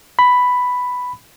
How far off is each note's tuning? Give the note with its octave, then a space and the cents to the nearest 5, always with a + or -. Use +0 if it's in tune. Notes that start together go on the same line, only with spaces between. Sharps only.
B5 +5